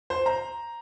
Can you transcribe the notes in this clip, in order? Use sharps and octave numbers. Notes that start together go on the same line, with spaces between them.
C5
A#5